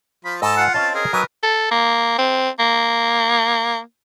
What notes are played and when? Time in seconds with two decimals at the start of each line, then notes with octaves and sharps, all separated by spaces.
0.25 F3 F4 B5
0.42 G#2 A4 D#5 A5 E6
0.57 F4 F#5
0.74 C4 C#4 D#5 F5 A5
0.95 G#4 A#4
1.13 F#3 D#4 B4 G#5 D#6
1.43 A4
1.71 A#3
2.18 C4
2.59 A#3